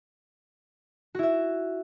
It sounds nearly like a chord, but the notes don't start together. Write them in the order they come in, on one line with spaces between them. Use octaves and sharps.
F#4 E4 E5